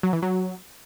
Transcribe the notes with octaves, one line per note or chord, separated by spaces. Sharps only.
F#3
E3
F#3